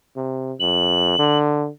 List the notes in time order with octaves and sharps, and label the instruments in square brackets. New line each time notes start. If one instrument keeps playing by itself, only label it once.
[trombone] C3
[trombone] F2 [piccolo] F#7
[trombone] D3